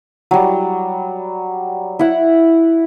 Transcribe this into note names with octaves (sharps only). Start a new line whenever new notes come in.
F#3 G3
E4 F#5